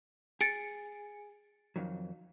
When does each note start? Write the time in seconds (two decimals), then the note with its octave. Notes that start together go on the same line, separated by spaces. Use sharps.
0.41 G#4 A6 C#7 D7
1.76 F2 D#3 F#3